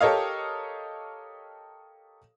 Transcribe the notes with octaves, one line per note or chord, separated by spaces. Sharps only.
G4 A4 A#4 C#5 D#5 F5